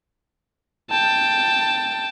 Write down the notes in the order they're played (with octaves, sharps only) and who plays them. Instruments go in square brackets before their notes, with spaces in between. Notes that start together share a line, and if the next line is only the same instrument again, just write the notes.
[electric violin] G5 A5